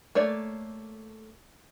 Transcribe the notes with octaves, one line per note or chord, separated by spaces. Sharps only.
A3 A#3 C#5 D5